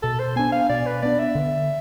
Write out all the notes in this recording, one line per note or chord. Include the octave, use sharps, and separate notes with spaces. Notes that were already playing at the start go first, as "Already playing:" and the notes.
B2 A4
C5
B3 D4 G#5
F5
B2 D5
B4
B3 D4 D5
E5
D3